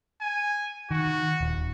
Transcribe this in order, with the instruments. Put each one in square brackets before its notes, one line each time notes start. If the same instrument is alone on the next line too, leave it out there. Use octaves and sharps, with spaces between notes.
[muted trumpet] G#5
[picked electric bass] D#3 [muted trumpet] F#4
[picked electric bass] D#1